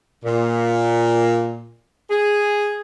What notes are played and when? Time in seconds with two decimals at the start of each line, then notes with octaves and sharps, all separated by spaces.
0.25 A#2
2.11 G#4